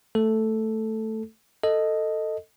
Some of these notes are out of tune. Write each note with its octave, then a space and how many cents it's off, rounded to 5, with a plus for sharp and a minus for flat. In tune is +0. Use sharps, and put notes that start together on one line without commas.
A3 +5 A4 +0
A4 +15 D#5 +0